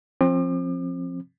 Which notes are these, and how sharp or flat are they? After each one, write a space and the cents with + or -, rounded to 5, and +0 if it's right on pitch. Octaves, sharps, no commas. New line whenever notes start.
F3 +0 C4 +25 D6 +40